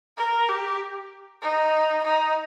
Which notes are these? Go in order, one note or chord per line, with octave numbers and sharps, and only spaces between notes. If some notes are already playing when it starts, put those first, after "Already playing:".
A#4
G4
D#4
D#4